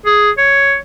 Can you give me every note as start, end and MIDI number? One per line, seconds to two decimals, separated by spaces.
0.06 0.30 68
0.38 0.76 73